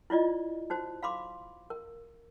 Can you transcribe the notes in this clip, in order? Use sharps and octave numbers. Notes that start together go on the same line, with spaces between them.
E4 F4 D5 D#5
D#4 F#4 C5
F5 B5 C6 D6
A#4